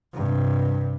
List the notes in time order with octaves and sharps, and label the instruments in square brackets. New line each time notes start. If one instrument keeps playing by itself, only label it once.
[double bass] G2 C3